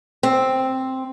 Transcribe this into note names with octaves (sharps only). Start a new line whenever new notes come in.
C4